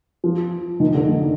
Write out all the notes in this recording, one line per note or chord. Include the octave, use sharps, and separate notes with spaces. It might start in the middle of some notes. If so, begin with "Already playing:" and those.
F3
D#3
D3
D#3